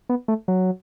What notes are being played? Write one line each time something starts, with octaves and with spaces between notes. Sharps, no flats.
B3
A3
F#3